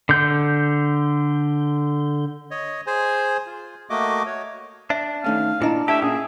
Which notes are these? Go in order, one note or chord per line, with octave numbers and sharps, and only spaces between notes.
D3 G6
C#5 D#5
G#4 C5 G#5
F4
A3 A#3 F#4 D#5 D6
F#4 C#5
D4 E5
D#3 A3 C#4 F5
A#2 D4 E4 D#5 A#5
A3 E4 G4 E5 A5
A#2 C#4 G#4